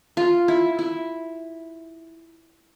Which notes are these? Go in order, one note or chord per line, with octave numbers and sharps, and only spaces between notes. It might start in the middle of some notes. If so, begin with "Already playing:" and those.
F4
E4
E4